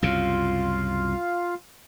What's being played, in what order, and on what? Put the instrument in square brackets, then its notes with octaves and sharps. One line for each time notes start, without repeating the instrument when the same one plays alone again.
[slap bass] C2 F#2 C#3 [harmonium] F4 F5